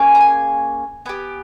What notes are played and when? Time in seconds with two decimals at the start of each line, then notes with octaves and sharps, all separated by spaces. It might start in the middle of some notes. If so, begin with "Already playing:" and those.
Already playing: A#3 C#4 G#4
0.15 A#5
0.21 G#5
1.06 B3 G4 G#5